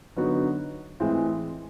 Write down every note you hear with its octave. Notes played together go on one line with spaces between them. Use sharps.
D3 F#3 B3 D#4 F#4
A2 E3 G#3 C4